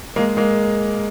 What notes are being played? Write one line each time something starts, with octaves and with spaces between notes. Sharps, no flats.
G#3 A#3
G#3 A#3